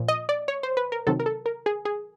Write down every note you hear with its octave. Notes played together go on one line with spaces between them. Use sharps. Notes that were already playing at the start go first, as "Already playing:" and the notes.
Already playing: A#2 F3
D#5
D5
C#5
C5
B4
A#4
C3 D#3 F#3 A4
A#4
A4
A#4
G#4
G#4